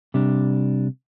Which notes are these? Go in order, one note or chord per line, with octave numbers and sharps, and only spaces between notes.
C3 G3 D4